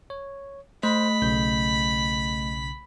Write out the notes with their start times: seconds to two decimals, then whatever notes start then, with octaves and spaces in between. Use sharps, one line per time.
0.10 C#5
0.83 A3 C5 B5
1.22 B1 C#3 G6